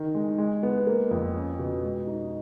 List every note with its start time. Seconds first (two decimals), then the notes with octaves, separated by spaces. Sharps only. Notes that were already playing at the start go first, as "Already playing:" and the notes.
Already playing: D#3
0.15 G#3
0.38 G#3
0.63 B3
0.87 A#3
1.11 F2
1.35 C#4
1.59 B2
1.83 G#3
2.07 D#4